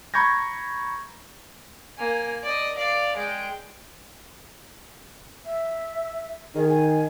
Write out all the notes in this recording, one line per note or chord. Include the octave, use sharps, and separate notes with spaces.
A#5 B5 C#6 G6 G#6 A#6
A#3 G#5
D5 D#5
D5 F5
G#3 G5
E5
D#3 G#4
G#5